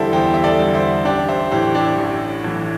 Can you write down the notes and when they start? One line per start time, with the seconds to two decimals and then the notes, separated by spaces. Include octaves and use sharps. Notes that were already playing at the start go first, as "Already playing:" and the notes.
Already playing: E2 D3 G3 E4 G4 A4 C5
0.13 E2 G4 C5
0.34 E5
0.44 A4 D5
0.59 D3 G3
0.75 C5 E5
1.05 A1 D4 G4
1.29 C5 E5
1.51 A2 E3 G4 C5
1.75 D4 G4
1.98 A1
2.44 A2 E3